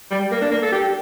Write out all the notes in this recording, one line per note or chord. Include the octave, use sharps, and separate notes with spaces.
G3
A#3
D4
A#3
A4
G4